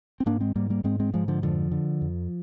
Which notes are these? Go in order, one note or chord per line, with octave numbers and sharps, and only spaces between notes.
C4
G#2 A#3 D4
G#3 C4
G#2 G3 A#3
G3 A#3
G#2 G#3 C4
G#3 C4
G#2 F3 G#3
D3 F3
F2 D3 F3
D3
F2